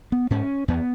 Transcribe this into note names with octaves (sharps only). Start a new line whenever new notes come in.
B3
G#2 C#4
E2 B3